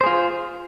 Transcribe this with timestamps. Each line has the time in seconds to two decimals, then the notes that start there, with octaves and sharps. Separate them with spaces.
0.01 C5
0.04 G#4
0.06 F4